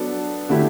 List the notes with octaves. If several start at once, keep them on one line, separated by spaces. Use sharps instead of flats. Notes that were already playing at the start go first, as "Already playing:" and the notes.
Already playing: F#3 B3 D4 A4
D3 A3 E4 G4